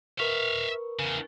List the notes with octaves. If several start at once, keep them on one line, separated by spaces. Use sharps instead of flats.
A#4 B4 E5 F5 C#6
E2 C#3